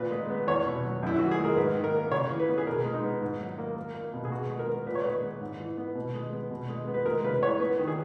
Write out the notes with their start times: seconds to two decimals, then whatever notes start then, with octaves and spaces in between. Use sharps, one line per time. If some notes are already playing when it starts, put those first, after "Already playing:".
Already playing: A#2 B4
0.11 G#3
0.30 B3
0.47 E2 C#5
0.66 B2
0.84 F#3
1.03 F#2 E4
1.19 E3 F#4
1.31 G#4
1.39 G#3
1.45 A#4
1.57 G#2 B4
1.75 D#3
1.84 A#4
1.94 A#3
2.12 C#3 C#5
2.30 E3
2.40 B4
2.49 B3
2.58 G#4
2.67 B2 A#4
2.85 G#3
2.94 D#4
3.03 B3
3.21 G#2
3.40 F#3
3.58 A#3
3.77 A#3
3.95 A#3
4.13 B2
4.25 G#4
4.32 B2 F#4
4.50 G#3
4.59 A#4
4.67 B3
4.86 A#2 B4
4.95 C#5
5.04 G#3 B4
5.23 B3
5.41 G#2
5.60 E3
5.78 B3
5.95 B2
6.14 G#3
6.33 B3
6.51 B2
6.69 G#3
6.87 B3
6.94 B4
7.05 G#3 A#4
7.24 C#3 B4
7.42 E3 C#5
7.60 B3 B4
7.79 D#3
7.88 G#4